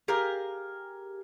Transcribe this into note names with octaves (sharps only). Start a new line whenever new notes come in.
G4 G#4 A#4 F5